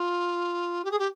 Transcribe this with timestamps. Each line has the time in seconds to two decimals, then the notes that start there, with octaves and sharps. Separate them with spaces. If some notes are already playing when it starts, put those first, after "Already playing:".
Already playing: F4
0.85 G4
0.91 G#4
0.99 G4